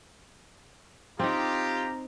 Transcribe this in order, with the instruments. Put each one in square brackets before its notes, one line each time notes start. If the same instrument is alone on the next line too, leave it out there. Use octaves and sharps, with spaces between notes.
[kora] C4 D#4 [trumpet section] F4 G4 [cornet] A#5